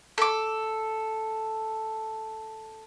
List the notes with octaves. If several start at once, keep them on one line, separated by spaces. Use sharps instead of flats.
A4 D6